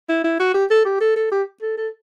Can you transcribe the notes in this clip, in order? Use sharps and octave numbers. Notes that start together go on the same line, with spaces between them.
E4
E4
F#4
G4
A4
G4
A4
A4
G4
A4
A4